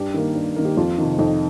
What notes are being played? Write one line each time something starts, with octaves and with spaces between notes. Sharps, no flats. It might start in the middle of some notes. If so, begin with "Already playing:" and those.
Already playing: G2 G4
D#3 A#3
G2
D#3 A#3
G4
F2 F4
C3 D#3
F2 D#4